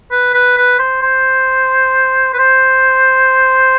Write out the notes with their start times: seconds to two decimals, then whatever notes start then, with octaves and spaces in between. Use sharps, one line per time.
0.11 B4
0.34 B4
0.58 B4
0.79 C5
1.03 C5
2.34 B4
2.39 C5